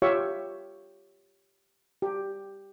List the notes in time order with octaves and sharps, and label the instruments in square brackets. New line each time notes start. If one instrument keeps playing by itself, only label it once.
[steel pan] F4 G4 C#5 E5 F5 C#6
G4